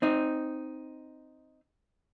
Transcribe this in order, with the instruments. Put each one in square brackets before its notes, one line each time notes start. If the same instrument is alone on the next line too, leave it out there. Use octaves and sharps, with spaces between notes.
[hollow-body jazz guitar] C4 D#4